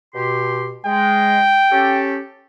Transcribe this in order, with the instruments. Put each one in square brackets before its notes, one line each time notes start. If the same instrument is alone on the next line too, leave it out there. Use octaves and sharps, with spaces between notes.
[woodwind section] B2 G4 C6
[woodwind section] G#3 [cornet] G5
[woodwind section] C#4 G4 A4